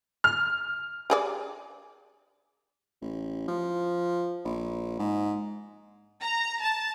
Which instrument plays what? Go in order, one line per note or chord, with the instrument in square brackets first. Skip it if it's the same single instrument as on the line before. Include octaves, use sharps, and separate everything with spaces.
[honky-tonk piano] F6
[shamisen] G4 G#4 D5
[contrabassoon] A1
F3
A#1
G#2
[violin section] A#5
A5